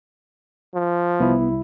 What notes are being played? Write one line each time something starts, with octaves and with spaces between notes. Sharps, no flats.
F3
C2 B3 E4